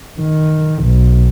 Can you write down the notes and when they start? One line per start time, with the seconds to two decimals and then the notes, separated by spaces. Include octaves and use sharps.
0.21 D#3
0.83 B1